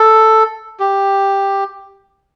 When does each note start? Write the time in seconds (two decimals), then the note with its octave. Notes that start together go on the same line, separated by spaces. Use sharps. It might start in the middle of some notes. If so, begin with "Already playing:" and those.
Already playing: A4
0.80 G4